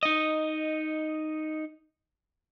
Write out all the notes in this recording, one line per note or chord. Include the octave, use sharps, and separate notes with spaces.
D#4 D#5